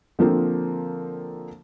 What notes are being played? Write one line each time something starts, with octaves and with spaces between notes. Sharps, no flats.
D3 F3 A#3 C4